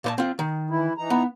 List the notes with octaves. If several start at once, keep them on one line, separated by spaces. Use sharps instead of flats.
A#2 C5 A5
C4 F4
D#3
E3 E4
E3 D#4 A#5
B3